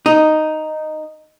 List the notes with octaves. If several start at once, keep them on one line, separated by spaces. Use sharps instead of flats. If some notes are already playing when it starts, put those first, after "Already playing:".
D#4